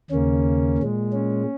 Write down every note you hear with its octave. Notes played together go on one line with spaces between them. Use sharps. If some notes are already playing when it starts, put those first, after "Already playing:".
D#2 C#3 A#3 C#4
A#2 G#3
C#4